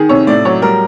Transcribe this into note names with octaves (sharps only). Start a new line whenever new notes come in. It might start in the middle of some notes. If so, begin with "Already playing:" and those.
Already playing: D#3 G#4
C3 C#5
A2 D5
F#3 C#5
G3 A#4